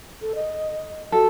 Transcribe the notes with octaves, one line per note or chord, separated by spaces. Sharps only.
A4
D#5
F#4 A4